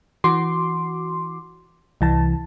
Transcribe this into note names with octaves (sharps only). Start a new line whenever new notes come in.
E3 F#4 C6 D6
C2 E3 A5